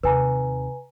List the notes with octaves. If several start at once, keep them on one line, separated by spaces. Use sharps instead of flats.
D#2 C3 B4 G#5 A#5